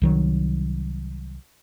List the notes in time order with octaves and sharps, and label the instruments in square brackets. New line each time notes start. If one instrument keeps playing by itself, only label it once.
[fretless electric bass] C2 D#3 F#3